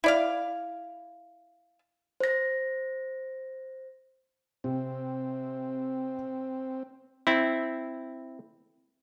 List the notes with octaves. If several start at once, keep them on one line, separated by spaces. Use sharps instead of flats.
E4 D5 F5
C5 A#6
C3 C4
C4 E4